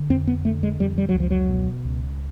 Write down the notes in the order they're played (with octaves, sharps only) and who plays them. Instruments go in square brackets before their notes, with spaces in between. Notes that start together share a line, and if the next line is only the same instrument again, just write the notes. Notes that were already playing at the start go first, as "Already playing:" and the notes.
Already playing: [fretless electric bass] D3
F2 C4
B3
D3 A3
G#3
F2 G3
G3
F#3
C#2
F3
F#3
B2
C#2